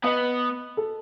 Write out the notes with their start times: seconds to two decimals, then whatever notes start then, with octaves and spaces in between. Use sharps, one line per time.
0.04 B3 D#5
0.77 A4